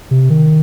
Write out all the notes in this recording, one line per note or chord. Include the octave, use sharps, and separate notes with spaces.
C3
D#3